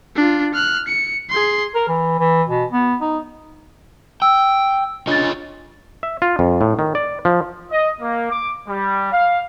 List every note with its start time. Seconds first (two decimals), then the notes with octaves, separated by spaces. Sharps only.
0.16 D4 F4
0.54 F6 F#6
0.87 C#7
1.30 G#4 C6
1.75 A#4
1.88 E3
2.19 E3
2.49 B2
2.72 B3
3.01 D#4
4.22 G5 E6
5.07 D4 F4 C#5 D#5 A6
6.03 E5
6.22 F4
6.39 F2
6.61 A2
6.79 D#3
6.95 D5
7.25 F3
7.71 D#5
8.00 A#3
8.31 D6
8.68 G3
9.12 F5